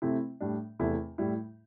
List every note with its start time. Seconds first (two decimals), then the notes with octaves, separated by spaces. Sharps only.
0.02 C3 A3 C4 E4
0.41 A2 G3 D4
0.79 E2 C3 A3 E4
1.18 A2 G3 E4